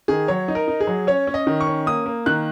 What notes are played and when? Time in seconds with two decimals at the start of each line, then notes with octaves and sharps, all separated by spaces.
0.08 D#3 G#4
0.28 F#3 C#5
0.48 D#4
0.55 A#4
0.68 D#4
0.81 G#4
0.87 F#3
1.07 C#4 C#5
1.27 C#4
1.34 D#5
1.47 D#3
1.61 C#6
1.67 C#4
1.86 A#3 D#6
2.06 A#3
2.26 D#3 F#6